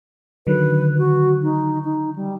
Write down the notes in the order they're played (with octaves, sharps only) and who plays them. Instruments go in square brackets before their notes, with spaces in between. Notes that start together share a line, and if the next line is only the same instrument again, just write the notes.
[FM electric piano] D3 D#3 F#3 [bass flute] B4
[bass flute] F#4
D#4
D#4
G3